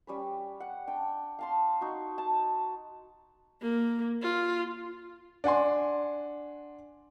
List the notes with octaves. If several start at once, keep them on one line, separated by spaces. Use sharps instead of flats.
G3 C#4 B4
F#5
D4 G5
F5 A5 C6
D#4 F#4
A5
A#3
F4
D4 F#5 G#5 C6